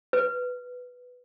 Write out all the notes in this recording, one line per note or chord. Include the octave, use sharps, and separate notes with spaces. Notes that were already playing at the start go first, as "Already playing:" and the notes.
B4